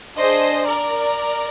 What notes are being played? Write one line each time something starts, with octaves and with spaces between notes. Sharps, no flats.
D4 G#4 C5 D#5
A#4 D5